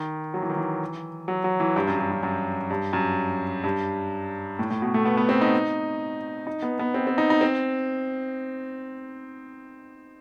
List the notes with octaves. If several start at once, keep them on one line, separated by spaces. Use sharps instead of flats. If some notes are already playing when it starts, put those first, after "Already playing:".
Already playing: D#3
F#3
E3
D#3
E3
F#3
F#3
E3
G2
F#2
G2
F#2
F#2
G2
F#2
G2
A2
A2
B2
A3
B3
B3
C4
D#4
D#4
B3
B3
C4
C4
D#4
D#4
C4